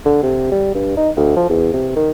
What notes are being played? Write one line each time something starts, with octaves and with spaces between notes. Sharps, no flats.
D3
C3
G3
G2
D#4
D2
F3
E2
C3
D#3